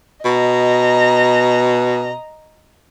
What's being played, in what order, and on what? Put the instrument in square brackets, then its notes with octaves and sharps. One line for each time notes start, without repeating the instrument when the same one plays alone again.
[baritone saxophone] B2 [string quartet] D#5 A#5